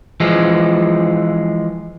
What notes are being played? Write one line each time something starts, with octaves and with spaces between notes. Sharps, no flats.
E3 F3 G#3